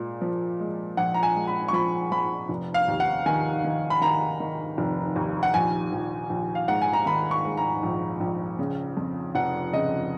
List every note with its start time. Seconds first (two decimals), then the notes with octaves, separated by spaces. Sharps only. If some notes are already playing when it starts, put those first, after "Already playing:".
Already playing: A#2 G#3
0.21 F3
0.60 G#3
0.97 A#1 F#5
1.14 A#5
1.23 G#5
1.36 G#3
1.48 B5
1.68 C#6
1.73 F3 B5
2.12 F3 B5
2.49 F1
2.74 F5
2.88 D#2
3.00 F#5
3.26 D#3 G#5
3.64 D#3
3.90 B5
4.01 D#3 A#5
4.40 D#3
4.78 F1
5.16 D#2
5.43 F#5
5.54 A#1 G#5
5.92 A#1
6.30 A#1
6.55 F5
6.68 G#2 F#5
6.82 G#5
6.93 A#5
7.06 D#3 B5
7.31 C#6
7.45 G#2
7.57 A#5
7.83 A#1
8.20 A#1
8.59 C#3
8.97 F2
9.35 F1 F#5
9.73 C#3 D#5